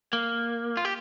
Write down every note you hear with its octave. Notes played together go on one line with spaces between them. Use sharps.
A#3
F4
G4